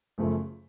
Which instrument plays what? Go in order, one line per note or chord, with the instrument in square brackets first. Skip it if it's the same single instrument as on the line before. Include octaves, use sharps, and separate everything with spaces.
[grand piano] F#2 C#3 F3 A3